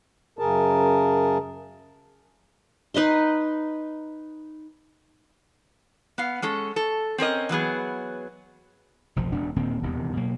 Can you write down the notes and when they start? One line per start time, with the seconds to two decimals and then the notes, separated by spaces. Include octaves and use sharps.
0.39 F#2 C#3 G#4 A#4 A5
2.94 D#4 B4 D#5 C6
6.18 B3 F5
6.42 G#3 C#4 A4
6.76 A4
7.18 C4 C#4 A#4 D#5
7.49 E3 F#3 B3 G#4
9.16 F1 B1 F3
9.32 E1 F#2 D4
9.56 D#1 A#2 D#3 C4
9.83 D#1 E2 C3 D#3
10.17 B2 F#3 A#3